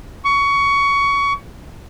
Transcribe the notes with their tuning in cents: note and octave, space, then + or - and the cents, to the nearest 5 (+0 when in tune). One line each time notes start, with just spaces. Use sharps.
C#6 +20